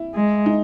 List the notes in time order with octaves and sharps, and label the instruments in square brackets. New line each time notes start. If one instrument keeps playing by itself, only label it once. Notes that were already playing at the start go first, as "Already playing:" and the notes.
Already playing: [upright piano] E4
[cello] G#3
[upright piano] D#4